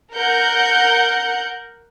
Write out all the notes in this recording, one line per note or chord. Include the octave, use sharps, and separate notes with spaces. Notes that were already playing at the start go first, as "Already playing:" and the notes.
A#4 F#5 G6